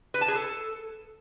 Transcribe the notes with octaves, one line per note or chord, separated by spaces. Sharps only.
B4
A5
G#4
A4